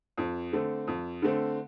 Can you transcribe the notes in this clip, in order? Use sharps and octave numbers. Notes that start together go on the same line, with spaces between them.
F2
D3 A3 C4
F2
D3 A3 C4